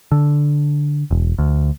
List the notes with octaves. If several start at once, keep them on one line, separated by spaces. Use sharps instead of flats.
D3
E1
D2